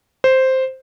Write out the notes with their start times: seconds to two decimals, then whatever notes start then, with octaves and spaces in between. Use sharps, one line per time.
0.24 C5